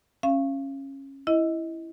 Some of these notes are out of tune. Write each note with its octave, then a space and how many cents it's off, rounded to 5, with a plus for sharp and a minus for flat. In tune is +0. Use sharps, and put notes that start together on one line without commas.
C#4 -20 F5 -30
E4 +0 D#5 +20